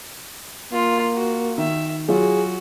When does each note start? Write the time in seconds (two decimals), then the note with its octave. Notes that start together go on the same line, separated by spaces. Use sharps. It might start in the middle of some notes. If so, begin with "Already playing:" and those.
0.73 A#3 F4
1.15 F#4
1.58 D#3 E5
2.09 F#3 F4 F#4 G#4